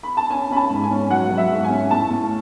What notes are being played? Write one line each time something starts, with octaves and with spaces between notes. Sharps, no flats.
B5
A5
C#4 G#5
C#4 B5
A5
G#2
G#5
C#4
F#3 F#5
F#3
E5
G#2
G#5
C#4
A2 A5
A2